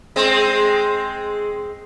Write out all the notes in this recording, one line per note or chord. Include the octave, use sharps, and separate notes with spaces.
G#3 C4